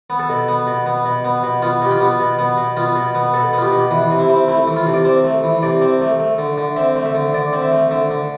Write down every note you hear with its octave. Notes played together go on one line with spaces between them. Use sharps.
B3
A4
B2
B3
B2
B3
B2
B3
B2
B3 F4
B2 G4
F4
B3
B2
B3
B2
B3 F4
B2
B3
B2 A4
B3 F4
G4
B2
E3 B4
C3
E4
C4
A3 E4
E3
F4
C3
D5
C4 C5
A3
E3
C3 D5
C4
A3
A3
D3
D3
C4 E5
A3
E5
D3
D3 D5
C4
E5
A3
D3 E5
D3